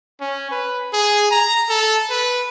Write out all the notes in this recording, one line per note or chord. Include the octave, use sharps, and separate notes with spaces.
C#4
B4
G#4
A#5
A4
B4